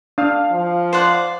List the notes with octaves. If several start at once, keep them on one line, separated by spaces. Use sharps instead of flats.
D4 F5
F3
C5 D5 F#5